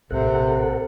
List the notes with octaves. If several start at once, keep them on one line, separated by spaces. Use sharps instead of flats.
A#1 A2 C3 C4 A4 A#4 F#5